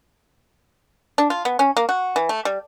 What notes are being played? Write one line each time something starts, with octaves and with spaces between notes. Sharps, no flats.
D4
F4
B3
C#4
A#3
F#4
E3
A3
G3